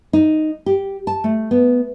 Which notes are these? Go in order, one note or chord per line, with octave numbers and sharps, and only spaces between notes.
D#4
G4
A5
A3
B3